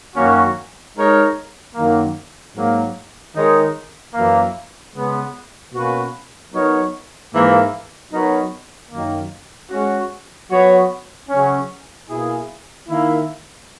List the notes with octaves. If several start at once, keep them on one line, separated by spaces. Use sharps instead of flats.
F#2 D#3 A#3 C#4 F#4
G#3 D#4 A#4 C#5
F#2 D#3 F#3 A#3
G#2 F#3 A#3
D#3 G#3 D#4 A#4 C#5
F#2 E3 A#3
C#3 G#3 B3
B2 A#3 C#4 F#4 B4
F#3 B3 D#4 A#4 C#5
G#2 E3 A#3
F#3 B3 D#4 A#4 C#5
F#2 D#3 A#3
G#3 C#4 F#4
F#3 B3 F#4 C#5
C#3 F#3 C#4
B2 A#3 E4 G#4
D#3 A#3 E4